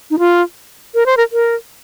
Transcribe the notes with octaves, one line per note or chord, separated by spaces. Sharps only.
D#4
F4
A#4
C5
A#4
A#4